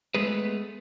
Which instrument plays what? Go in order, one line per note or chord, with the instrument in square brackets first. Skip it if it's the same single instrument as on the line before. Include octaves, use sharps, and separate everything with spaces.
[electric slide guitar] G#3 A3 B3 G#4 B4